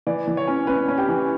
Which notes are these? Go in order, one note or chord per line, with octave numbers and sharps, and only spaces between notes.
E3 D5
E3
C#5
C#4
C#4 B4
C#4
G4
E3